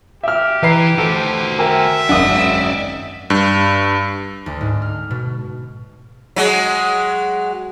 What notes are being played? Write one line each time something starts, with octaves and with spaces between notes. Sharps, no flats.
G4 E5 F6
E3 B4 A#5 C7
F#4 A4 C5
A#4 E5 G5 G#5
G#1 F#2 D5 D#5 F#5 D#6
G2
D2
G#2
F6
B2
F#3 G#3